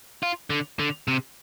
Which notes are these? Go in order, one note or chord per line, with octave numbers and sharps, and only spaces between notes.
F4
D3
D3
C3